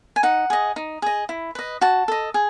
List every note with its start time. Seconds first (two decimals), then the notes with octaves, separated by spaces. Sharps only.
0.16 G#5
0.23 D#4 F#5
0.50 G#4 D#5
0.76 D#4
1.02 G#4 D#5
1.29 E4
1.55 B4 D#5
1.81 F#4 A5
2.08 A4 D#5
2.34 G#4